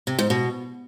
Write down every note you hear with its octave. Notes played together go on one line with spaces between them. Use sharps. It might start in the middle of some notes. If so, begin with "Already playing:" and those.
C3
G#2
B2